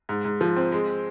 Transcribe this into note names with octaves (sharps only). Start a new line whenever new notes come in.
G#2
G#2
F3
C4
G#3